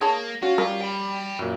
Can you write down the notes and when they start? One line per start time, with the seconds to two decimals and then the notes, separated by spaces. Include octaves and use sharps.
0.01 A#3 G#4 C#5 A5
0.43 C#4 F4 F#4
0.58 G3 C#4 A#4
0.82 G5 B5
1.39 F#2 A#2